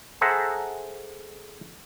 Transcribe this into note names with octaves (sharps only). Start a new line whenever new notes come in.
G#4 A4 C5 E5 F#5 A#5